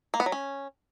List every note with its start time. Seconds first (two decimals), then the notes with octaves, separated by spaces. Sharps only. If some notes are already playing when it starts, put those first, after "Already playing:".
0.14 A#3
0.20 B3
0.26 F#3
0.32 C#4